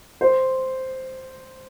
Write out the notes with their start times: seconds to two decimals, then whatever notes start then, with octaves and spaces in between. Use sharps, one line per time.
0.21 C5